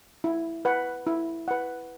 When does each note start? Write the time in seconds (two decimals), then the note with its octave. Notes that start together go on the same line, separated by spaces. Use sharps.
0.24 E4
0.65 B4 F#5
1.07 E4
1.48 B4 F#5